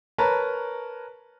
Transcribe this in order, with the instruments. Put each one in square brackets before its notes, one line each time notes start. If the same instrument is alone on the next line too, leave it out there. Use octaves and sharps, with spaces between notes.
[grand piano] A#4 B4 C#5 A5 A#5